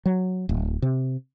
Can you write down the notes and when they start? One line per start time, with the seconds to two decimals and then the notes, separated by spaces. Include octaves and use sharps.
0.06 F#3
0.49 D1
0.82 C3